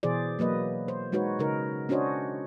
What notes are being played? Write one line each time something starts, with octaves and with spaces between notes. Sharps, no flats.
B2 E3 G#4 C5 D5
F#3 A#3 B4 D#5
C5
G#3 D#4 F#4 B4 C#5
C#3 D#4 A#4
C#4 D4 F#4 C5 C#5 D#5